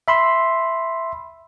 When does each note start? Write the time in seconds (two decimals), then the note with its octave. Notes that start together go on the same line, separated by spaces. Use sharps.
0.08 E5 B5 C6 E6